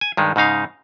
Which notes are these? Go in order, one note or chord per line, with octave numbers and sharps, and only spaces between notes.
G#5
G2 D#3 G#3
G#2 C#3 D#4 F5